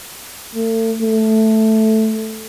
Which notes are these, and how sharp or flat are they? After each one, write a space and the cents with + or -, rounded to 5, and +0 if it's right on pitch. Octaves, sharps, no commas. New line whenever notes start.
A3 +40
A3 +0